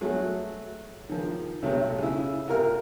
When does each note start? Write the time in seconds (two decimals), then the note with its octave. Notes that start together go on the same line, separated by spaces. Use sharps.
0.01 F#3 A3 F#4 G#4
1.09 D#3 F3
1.62 B1 C3 F#3 A3
1.98 C#3 E4
2.48 C3 F4 A#4 F6